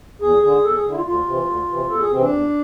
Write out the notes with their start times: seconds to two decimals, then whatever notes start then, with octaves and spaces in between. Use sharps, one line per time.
0.22 E2 G#4
0.43 D3 G#4
0.64 E2 A4
0.74 G#4
0.86 D3
0.91 E4
0.95 F4
1.06 D2 F4
1.27 C3 E3
1.48 D2
1.70 C3 E3
1.90 E2 A4
2.00 G#4
2.11 C3 E3 C4
2.21 D4
2.33 E2